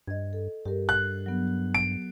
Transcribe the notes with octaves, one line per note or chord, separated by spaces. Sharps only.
G2 D#5 G#6
A4
G2 G4 A#4
F#6
F#3 B3
D7